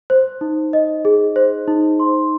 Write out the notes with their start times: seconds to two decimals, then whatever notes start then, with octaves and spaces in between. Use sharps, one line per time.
0.10 C5
0.41 D#4
0.73 D#5
1.05 G#4
1.36 C5
1.68 D#4
2.00 C6